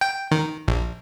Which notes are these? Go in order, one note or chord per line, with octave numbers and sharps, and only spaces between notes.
G5
D#3
A#1